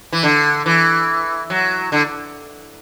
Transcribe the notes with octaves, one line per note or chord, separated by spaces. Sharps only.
E3
D3
E3
F#3
D3